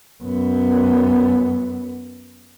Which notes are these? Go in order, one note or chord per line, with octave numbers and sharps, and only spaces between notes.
F#2 B3